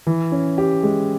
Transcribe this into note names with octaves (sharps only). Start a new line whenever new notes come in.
E3
C#4
G4
G#3